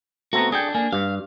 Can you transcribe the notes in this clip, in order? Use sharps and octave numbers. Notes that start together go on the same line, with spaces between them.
A3 B3 C4 F#4 A#5
D4 G#4 A4 G5
A#3 D4 G#5
G2 F5